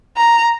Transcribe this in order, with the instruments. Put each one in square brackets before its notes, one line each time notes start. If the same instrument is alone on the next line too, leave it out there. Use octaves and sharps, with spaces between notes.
[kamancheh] A#5